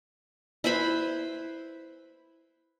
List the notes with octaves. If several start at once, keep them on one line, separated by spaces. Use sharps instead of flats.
E4 B4 C5 B5